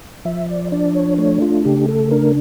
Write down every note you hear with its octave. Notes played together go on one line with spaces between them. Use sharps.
F3 E5
D5
D4 D5
C#5
A3 C#5
F4
C#3 G4
A4
D4 A#4